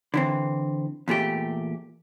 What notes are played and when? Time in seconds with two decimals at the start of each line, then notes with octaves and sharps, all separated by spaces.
0.14 D3 E3 C4
1.08 E2 A#2 A3 G4